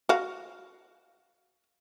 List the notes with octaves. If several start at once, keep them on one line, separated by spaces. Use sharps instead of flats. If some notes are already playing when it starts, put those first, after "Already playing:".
F#4 F5